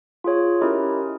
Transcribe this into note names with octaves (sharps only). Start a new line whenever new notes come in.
F4 G#4 C#5
C#4 E4 G4 A#4 D#5